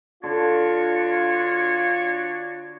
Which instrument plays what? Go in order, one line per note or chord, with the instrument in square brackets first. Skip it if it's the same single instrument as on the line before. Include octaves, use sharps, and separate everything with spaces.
[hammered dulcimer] D3 [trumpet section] D4 F#4 C#5 [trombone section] F4